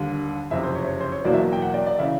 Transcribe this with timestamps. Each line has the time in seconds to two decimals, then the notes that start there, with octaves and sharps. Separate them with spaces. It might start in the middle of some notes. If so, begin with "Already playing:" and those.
Already playing: D#2 D3 G3
0.50 F#1 F2 C3 E5
0.63 C5
0.75 C#5
0.87 C#5
1.01 C5
1.12 C#5
1.25 E2 B2 F#3 A#3 D5
1.34 E5
1.53 G5
1.62 F#5
1.74 D5
1.86 D5
1.99 C#3 E3 E5